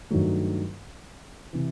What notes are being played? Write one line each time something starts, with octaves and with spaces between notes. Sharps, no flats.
G2 D#3 F#3 A3
C3 E3